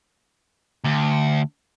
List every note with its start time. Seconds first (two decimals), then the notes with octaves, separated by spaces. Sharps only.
0.85 D2